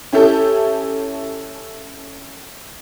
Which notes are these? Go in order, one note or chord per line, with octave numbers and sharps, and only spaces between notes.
C#4 E4 G4 A4